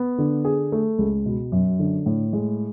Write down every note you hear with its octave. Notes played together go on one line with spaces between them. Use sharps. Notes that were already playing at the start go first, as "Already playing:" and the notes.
Already playing: B3
D3
G#4
A3
C#2
B2
F#2
D3
A2
G#3